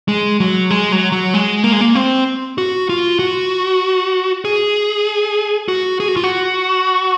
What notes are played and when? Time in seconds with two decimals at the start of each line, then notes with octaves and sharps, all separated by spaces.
0.08 G#3
0.40 F#3
0.70 G#3
0.92 F#3
1.12 F#3
1.34 G#3
1.64 A#3
1.72 G#3
1.81 A#3
1.95 C4
2.58 F#4
2.89 F4
3.19 F#4
4.45 G#4
5.68 F#4
6.00 G#4
6.08 F#4
6.16 F4
6.24 F#4